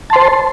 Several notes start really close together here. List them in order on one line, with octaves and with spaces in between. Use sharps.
A5 C6 C5